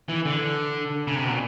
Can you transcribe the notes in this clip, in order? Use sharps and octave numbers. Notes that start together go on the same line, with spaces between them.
E3
D3
C#3
C3
B2
A#2